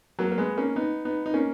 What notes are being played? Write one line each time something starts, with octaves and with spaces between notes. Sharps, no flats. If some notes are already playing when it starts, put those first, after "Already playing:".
F#3 A#3
A#3
G#3 B3
A#3 C#4
B3 D#4
B3 D#4
D#4
A#3 C#4